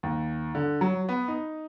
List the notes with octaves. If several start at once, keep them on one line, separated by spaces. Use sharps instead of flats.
D#2
D3
F#3
B3
D#4